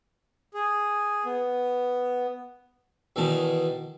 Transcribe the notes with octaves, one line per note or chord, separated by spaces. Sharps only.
G#4
B3
E2 B2 D#3 A5